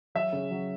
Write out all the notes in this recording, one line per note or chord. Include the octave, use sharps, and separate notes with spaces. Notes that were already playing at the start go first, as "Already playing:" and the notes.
F#3 E5
C#3
F#3